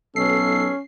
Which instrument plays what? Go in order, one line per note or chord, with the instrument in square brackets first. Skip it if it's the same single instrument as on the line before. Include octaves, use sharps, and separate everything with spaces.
[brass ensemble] B1 [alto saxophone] C#4 [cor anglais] A4 [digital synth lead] C7